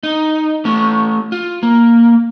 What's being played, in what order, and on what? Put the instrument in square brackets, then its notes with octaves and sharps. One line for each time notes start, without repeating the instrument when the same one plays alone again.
[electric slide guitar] D#4
A3 C#4
F4
A#3